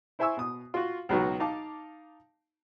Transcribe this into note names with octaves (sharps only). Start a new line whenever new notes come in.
E4 C5 E5 G#5 C#6 E6
B2 D#6
F4 F#4
C#2 B2 F#3 B3 D#4 F#4
D#4 F5 A5 D6